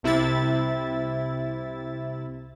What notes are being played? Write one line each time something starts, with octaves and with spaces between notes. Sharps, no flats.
C2 C3 E4 E5 A6